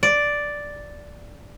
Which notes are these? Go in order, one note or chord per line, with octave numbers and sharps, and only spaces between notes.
D5